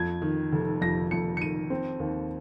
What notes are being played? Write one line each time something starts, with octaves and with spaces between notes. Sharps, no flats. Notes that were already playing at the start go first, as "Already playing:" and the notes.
Already playing: F2 G#6
D#3
F1
F2 A#6
F2 C#7
C#7
D#3 D#7
C4
D#2